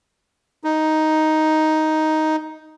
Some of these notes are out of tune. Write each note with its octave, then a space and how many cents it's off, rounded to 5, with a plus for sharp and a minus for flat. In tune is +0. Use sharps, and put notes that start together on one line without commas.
D#4 +5